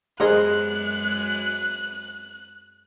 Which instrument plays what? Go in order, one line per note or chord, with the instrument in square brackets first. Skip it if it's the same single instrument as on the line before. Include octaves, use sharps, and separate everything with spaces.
[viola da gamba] F#2 G#3 [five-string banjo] B3 C5 D#5 [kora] G#4 A#4 [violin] F#6